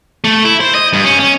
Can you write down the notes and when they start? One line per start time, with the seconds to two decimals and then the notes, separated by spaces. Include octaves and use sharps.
0.24 A3
0.45 E4
0.60 C5
0.75 D#5
0.93 G2
1.05 C#4
1.20 C#4